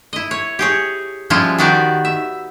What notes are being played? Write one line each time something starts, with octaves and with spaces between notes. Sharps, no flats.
E4 D#5
C#5
G4 G#4 C#5
F3 G3 G#3 C#4 E4 F4
D#3 B3 F#4 G4 D5
E5